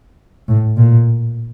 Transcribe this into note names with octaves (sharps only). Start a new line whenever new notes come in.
A2
A#2